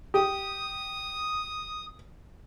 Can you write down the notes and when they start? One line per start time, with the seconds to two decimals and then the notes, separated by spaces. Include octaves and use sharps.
0.14 G4 D#6